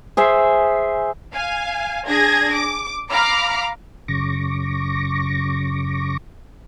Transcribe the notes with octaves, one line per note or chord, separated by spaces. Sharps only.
G#4 C5 E5
F5 G#5
D4 G#4 G#6 A#6
D6
F5 A#5 B5 D6 F6
F#2 C#3 C#6 D6 A#6